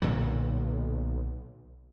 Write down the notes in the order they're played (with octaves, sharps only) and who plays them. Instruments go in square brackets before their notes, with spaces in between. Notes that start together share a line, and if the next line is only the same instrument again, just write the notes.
[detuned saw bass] B1 [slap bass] A#2 D3 F#3